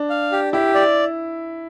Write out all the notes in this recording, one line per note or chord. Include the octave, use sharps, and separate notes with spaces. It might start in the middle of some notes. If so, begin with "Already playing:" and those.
Already playing: D4
F5
G4
E4 G4
D5